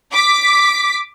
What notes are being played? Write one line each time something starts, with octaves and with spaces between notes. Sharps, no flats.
D6 B6